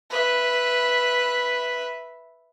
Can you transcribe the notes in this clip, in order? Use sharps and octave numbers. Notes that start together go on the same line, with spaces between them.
B4 E5